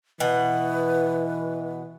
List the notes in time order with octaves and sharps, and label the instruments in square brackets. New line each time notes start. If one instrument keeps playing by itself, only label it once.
[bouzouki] B2 F#5 [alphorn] E3 [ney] B4